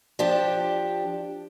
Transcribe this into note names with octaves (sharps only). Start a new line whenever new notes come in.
F3 D4 G4